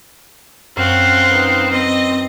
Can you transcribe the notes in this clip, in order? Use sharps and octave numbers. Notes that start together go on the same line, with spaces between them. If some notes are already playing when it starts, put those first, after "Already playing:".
F#2 C4 F5 F#5
D#4 B4
C4 D#5